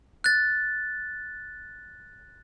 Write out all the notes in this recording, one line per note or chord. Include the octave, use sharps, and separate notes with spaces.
F#6 A6